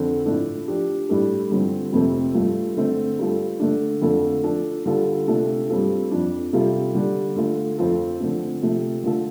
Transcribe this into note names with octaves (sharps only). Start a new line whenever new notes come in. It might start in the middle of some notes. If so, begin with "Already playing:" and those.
Already playing: F2 D3 C4 A4
A2 F3 A3 D4
F3 D4 G4
A2 G3 D4 A4
G2 D3 F3 C4
F2 C3 A3 C4 A4
G2 F3 A3 F4
D3 A3 C4
G2 G3 F4 A4
D3 A3 D4
F2 D3 A3 F4 A4
F3 D4 A4
D3 G3 F4 A4
C3 A3 D4 F4 A4
G2 G3 C4 F4 A4
F2 F3 D4
C3 G3 F4 A4
D3 G3 D4
D3 A3 F4 A4
F2 F3 C4 F4 A4
D3 F3 A3 C4
C3 F3 A3
D3 A3 F4 A4